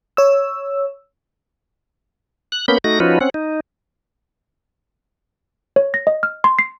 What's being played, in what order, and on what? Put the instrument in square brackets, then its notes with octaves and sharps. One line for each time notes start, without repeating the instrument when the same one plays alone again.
[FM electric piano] C#5 E6
[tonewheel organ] F#6
A#3 B3 C#4 B5 G6
A3 D#4 F#4 A#6
F3 C#4 D#4 F4 F#4 B4
C4 C#4 F#5
D#4
[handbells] C#5
A#6
D#5
F6
C6
C7